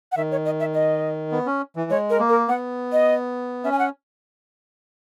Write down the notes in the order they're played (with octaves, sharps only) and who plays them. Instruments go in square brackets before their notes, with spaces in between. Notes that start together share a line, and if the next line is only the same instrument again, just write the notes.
[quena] F#5
[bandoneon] D#3 [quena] E5
[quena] C#5
D#5
E5
D#5
[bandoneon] B3
C#4
E3
[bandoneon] G#3 [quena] C#5
[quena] A#4
[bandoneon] A#3
[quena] A#4
[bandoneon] B3 [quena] F#5
[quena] D#5
[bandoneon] C#4 [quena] E5
[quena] G#5
F#5